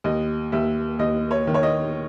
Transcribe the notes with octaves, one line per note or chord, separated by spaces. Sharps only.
D#2 D#5
D#2 E5
D#2 D#5
C#5
D#3
C#5
D#5